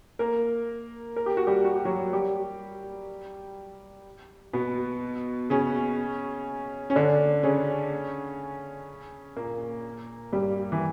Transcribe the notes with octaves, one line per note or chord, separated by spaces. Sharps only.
A#3 A#4
A#4
G4
F#4
G3 G4
F#4
G4
F#3 F#4
G3 G4
B2 B3
C#3 C#4
C#4
D3 D4
C#3 C#4
A#2 A#3
G2 G3
E3